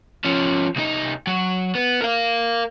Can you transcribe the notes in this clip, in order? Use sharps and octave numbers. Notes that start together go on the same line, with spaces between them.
F3 C#4
C2 D#4
F#3
B3
A#4 F5